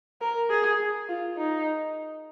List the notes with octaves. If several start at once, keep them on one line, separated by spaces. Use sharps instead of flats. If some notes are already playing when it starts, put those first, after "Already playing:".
A#4
G#4
F4
D#4